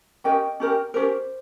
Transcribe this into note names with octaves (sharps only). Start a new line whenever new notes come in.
C#4 G4 A#4 D#5 G5
C#4 G4 A#4
C#4 G4 A#4 C5